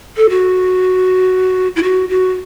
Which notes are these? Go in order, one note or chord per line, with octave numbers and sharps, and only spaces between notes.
A4
F#4
E4
F#4
F#4